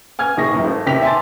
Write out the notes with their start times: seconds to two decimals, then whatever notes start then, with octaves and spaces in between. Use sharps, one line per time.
0.19 G#5 F6 G#6
0.37 A#1 D#2 D#3 G#4 C#6 A#6
0.52 C2 F#2 E3
0.64 G#1 A3
0.86 D#2 C3 D#3 G5 B6 F7
1.02 E5 G#5 A5 C6 D6 A6